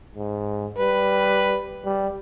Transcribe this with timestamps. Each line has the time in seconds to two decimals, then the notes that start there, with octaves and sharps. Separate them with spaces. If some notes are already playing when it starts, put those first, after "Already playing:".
0.15 G#2
0.78 G3 B4
1.85 G3